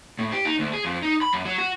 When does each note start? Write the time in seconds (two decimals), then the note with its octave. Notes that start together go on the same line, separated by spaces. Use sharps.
0.19 A2
0.32 G4
0.45 D#4
0.59 D2
0.73 G#4
0.85 F2
1.03 D#4
1.22 B5
1.33 F#2
1.45 F#3
1.58 F#4